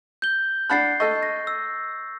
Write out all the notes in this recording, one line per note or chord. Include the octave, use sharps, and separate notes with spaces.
G6 G7
D4 F#5 B5 F#6 A6 C7
A4 D#5 C#6
A#6
E6